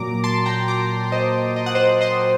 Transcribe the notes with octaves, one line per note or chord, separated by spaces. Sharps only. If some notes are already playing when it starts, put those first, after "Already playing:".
Already playing: A#2 F#3 A#5 D6
A5 C6
G5 A#5
A#5 D6
C5 D#5
D#5
F#5
C5 D#5
C5 D#5